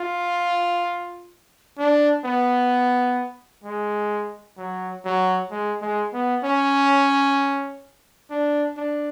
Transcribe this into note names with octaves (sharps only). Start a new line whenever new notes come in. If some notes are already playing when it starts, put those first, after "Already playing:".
Already playing: F4
D4
B3
G#3
F#3
F#3
G#3
G#3
B3
C#4
D4
D4